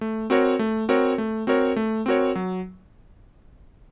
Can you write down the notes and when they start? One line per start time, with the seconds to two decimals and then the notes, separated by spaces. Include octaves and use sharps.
0.01 A3
0.30 C4 F#4 A#4 C#5
0.59 A3
0.89 C4 F#4 A#4 C#5
1.18 A3
1.47 C4 F#4 A#4 C#5
1.76 A3
2.06 C4 F#4 A#4 C#5
2.35 F#3